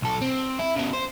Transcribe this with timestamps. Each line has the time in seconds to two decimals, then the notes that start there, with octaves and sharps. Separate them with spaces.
0.02 B1 A4
0.22 C4
0.59 E4
0.77 C#3 B3
0.94 C5